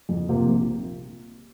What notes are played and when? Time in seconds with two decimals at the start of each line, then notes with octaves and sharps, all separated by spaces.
0.09 F2
0.29 C3 A#3 F4
0.48 A#1